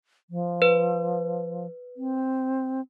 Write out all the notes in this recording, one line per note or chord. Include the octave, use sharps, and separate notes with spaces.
F3
B4
C4